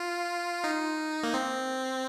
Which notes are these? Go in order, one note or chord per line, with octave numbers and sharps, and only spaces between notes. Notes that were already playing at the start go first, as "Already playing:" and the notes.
Already playing: F4
D#4
A#3
C4